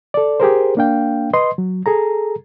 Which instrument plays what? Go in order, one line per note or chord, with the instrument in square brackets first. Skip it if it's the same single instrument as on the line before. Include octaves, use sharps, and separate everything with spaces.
[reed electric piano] A4 D5
G4 G#4 A#4 C5
A#3 D4 F5 G5
B4 D#5 C6
F#3
G#4 A4 A#5